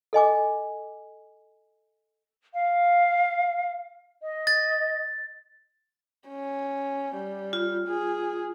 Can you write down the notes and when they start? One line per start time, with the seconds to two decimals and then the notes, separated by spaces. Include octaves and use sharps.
0.13 A4 D#5 G#5 D6
2.53 F5
4.22 D#5
4.47 A6
6.29 C#4
7.15 G3
7.53 F4
7.88 G#4